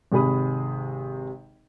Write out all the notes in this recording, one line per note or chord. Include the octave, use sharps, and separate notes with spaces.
G#1 C3 G#4 B5 D#6